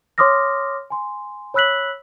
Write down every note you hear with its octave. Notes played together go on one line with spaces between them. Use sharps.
C#5 C6 D6 D#6 F6 A#6
G#5 C6
C#5 B5 E6 F#6 B6 F#7